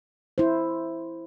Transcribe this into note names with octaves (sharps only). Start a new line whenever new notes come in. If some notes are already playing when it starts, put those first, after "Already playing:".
E4 C5